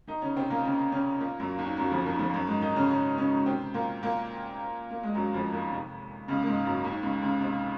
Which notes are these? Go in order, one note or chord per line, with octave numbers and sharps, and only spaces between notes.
D#3 D#4
C#3 C#4
C3 C4
A#2 A#3
C#3 C#4
C#3 C#4
A#2 A#3
F#2 F#3
D#2 D#3
F#2 F#3
F2 F3
D#2 D#3
F2 F3
F#2 F#3
G#2 G#3
D#3 D#4
C#3 C#4
C#3 C#4
C#3 C#4
C3 C4
A#2 A#3
A#2 A#3
A#3
G#3
F#2 F#3
F2 F3
D#2 D#3
C3
C#2 C#3
A#3
G#2 G#3
F#2 F#3
D#2 D#3
C#2 C#3
C#2 C#3
C3